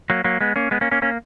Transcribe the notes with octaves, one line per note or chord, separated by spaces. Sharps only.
F#3 A#3
F#3 A#3
G#3 B3
A#3 C#4
G#3 B3
A#3 C#4
A#3 C#4
A#3 C#4